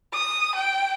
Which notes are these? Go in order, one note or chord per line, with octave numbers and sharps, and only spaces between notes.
D#6
G5